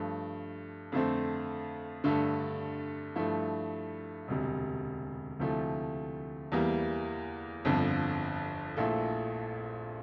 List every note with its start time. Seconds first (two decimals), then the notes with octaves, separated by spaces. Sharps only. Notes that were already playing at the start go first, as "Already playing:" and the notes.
Already playing: G2 F3 A3
0.92 F2 D3 A3 C4
2.04 G2 D3 A3
3.16 G2 F3 A3 E4
4.28 E1 D2 C3 G3
5.40 D2 C3 F3 A3 E4
6.52 E2 E3 G3 A#3
7.65 G1 F2 D3 F3
8.77 A#1 A#2 A3 E4 A4